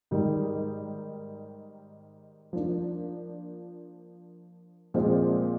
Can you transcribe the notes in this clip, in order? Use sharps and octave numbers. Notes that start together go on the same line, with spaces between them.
G#2 D#3 G3
F3 A#3 D4
A#2 F3 G#3 C4